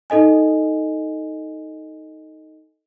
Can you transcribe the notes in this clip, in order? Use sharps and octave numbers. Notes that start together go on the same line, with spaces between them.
D#4 A4 D#5 G#5